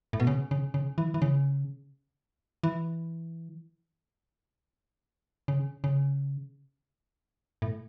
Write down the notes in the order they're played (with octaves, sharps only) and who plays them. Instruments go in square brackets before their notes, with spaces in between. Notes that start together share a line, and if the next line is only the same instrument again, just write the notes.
[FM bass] A2
B2
C#3
C#3
C#3
E3
E3
C#3
E3
C#3
C#3
A2